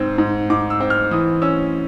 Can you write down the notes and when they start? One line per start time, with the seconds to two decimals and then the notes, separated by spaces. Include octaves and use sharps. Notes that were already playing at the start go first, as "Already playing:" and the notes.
Already playing: G#2 C4
0.18 G#2
0.50 G#2 D6
0.70 E6
0.80 C4
0.90 F6
1.11 E3 D#6
1.42 C#4 E6